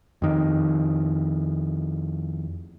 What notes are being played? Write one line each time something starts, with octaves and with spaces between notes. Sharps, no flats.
F2 D#3